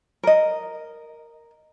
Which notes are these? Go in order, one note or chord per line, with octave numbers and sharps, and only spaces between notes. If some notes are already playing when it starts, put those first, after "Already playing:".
A#4 D#5